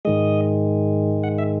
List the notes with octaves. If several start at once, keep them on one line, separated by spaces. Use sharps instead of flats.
G#2 D#3 G#3 D#5
F#5
E5